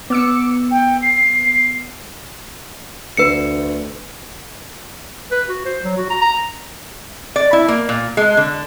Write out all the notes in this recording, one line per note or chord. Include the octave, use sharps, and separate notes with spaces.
B3 D6 E6 C#7
G5
C7
D2 B4 C#7
B4
F#4
C5
F#3
F#4
A#5
A#5
D5
E4
A#3
A#2
G#3
D3